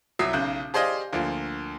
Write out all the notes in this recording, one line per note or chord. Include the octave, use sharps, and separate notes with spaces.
C2 F#3 E5 D#6 C7
B1 C#3 F#6 G6
G4 G#4 C5 D5 D#5 F5
D2 F3 A#3